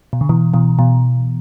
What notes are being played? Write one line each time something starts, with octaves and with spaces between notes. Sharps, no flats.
B2
D3
B2 E3
B2 E3
B2